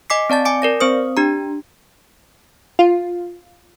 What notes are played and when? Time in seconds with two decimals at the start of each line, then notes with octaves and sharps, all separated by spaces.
0.10 D#5 G#5 D6 B6 C7
0.30 C4 D5 A5 A6
0.45 G#5 D6 D7
0.62 A#4 D5 A#6
0.80 C4 C5 D#6
1.17 D4 G4 A#5
2.79 F4